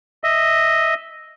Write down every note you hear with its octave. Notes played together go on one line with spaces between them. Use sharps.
D#5 E5